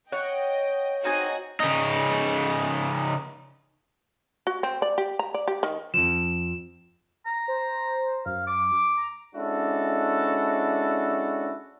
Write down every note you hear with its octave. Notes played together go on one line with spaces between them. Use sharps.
C#5 D#5 F#5 G5
C4 D#4 F#4 G#4 D#5 G#5
C#3 D#4
F#4
C4
D5
G4
A#5
D5
G4
D#3
F2 F3 E7
A#5
C5
F#2 F5
D6
A#5
G#3 C#4 D4 E4 F#4 A4